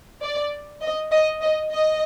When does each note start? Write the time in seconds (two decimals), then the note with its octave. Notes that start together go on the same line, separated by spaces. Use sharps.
0.21 D5
0.82 D#5
1.11 D#5
1.41 D#5
1.71 D#5